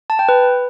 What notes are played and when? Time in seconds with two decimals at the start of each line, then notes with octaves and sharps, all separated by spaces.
0.10 A5
0.19 G5
0.29 B4